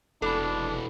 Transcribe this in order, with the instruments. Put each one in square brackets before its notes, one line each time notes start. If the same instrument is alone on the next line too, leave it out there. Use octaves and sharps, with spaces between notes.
[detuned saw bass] F1 [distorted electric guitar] B2 E3 [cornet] D4 [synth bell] A4 B5